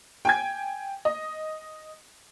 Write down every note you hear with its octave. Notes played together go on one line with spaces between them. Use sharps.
G5 G#5 G#6
D#5